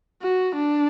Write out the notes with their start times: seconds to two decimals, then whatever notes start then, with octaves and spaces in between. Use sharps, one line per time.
0.23 F#4
0.56 D4